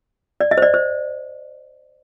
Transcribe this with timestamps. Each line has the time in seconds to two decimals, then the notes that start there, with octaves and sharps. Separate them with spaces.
0.41 D5
0.51 D#5
0.58 C5
0.62 D5
0.74 C5